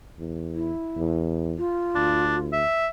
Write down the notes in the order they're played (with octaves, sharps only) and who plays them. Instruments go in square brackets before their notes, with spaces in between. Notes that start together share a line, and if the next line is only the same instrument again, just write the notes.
[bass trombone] E2
[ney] E4
[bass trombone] E2
[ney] F4
[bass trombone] D2 [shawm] D4
[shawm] E5